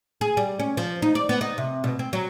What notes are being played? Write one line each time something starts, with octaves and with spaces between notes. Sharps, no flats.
G#4
G3
C#4
F3
D#4
D5
B3
D#4
C3
B2
C4
F#3